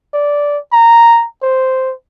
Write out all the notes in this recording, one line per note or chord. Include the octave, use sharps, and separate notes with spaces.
D5
A#5
C5